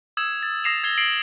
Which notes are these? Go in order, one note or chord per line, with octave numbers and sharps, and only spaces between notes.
D#6 E6 G#6 E7
A6
D#6 A#6 C7 E7 F7
G#6 C7 G7
C7 D7 F#7